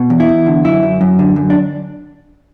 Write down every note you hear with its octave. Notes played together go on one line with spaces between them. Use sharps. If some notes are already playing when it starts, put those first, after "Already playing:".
Already playing: B2
E2
E4
E2
D3
F#2 E4
F#2
F#2
D3
F#2
D4